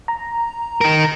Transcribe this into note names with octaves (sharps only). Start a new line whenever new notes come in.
A#5
D#4 A#4